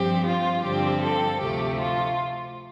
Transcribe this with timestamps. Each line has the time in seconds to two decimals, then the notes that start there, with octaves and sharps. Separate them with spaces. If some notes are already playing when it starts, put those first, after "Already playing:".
Already playing: G2 F3 C4 G4
0.24 F4
0.62 G2 D3 F3 C4 G4
1.00 A4
1.39 D2 C3 F3 A3 G4
1.78 F4